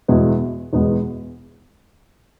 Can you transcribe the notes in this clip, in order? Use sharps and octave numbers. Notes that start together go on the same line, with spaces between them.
E2 B2 G#3 B3 E4
E2 B2 G#3 B3 E4